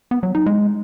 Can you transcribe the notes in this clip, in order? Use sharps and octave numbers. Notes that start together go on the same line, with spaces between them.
B3
F#3
D#4
G#3